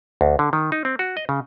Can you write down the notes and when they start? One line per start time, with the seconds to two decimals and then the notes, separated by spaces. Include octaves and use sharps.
0.21 D2
0.39 D3
0.53 D#3
0.72 D#4
0.85 C4
0.99 F#4
1.17 D#5
1.29 C#3